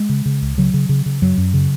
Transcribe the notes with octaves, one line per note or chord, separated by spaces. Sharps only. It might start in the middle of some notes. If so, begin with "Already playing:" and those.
Already playing: G#3
C#3
C#3
C#2
C#3 F#3
C#3
C#3
C#3
F#2 F#3
F#2
C#3